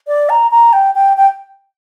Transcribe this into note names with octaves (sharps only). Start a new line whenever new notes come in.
D5
A#5
A#5
G5
G5
G5